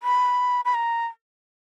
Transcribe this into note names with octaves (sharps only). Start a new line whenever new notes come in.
B5
B5
A#5